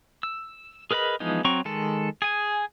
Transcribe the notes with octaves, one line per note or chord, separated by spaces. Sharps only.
E6
G#4 A#4 B4 D#5 B5
E3 F3 G#3 B3 D#4
F#3 C4 A#5 C#6
D#3 G#3 A4
G#4 G#5